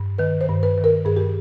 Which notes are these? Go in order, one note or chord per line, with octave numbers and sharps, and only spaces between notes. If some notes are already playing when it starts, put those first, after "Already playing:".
Already playing: G2
D#3 B4
C5
G2
B4
D#3
A#4
G2 G#4
G4